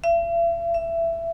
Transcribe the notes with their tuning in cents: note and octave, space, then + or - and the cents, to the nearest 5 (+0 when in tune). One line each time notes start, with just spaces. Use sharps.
E5 +45
E5 +20